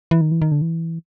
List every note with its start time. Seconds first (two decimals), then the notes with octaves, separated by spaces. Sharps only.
0.11 E3
0.21 D#3
0.31 E3
0.42 D#3
0.52 D3
0.62 E3